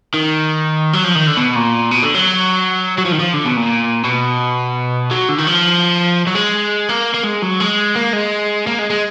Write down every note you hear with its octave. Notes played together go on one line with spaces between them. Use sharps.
D#3
F#3
F3
D#3
D3
B2
A#2
B2
D3
F#3
F#3
F3
D#3
F3
D3
B2
A#2
B2
F#3
D3
D#3
F3
F#3
G#3
A#3
A#3
G#3
F#3
G#3
A#3
G#3
A#3
G#3
G#3